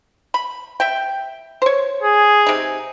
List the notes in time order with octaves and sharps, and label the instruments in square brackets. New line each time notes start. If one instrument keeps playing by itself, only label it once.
[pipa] B5
E5 G5
C5 C#5
[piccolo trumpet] G#4
[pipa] C3 D#4